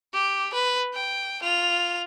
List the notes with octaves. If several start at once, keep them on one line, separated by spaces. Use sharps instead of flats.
G4
B4
G5
F4 F7